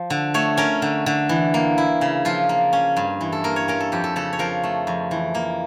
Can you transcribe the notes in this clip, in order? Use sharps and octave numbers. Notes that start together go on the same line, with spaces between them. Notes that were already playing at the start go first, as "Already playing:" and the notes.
Already playing: F3
D3
A3 C#5
C#4 A#4
D3
D3
E3
A#3
E4
C#3
F3 F4
A#3
C#4
G2
E3
A4
A#3 A#4
C#5
C#4 A#4
A4
F2 G4
A4
C#3 A4
C#5
F3 A#4
A3
F2
E3
A#3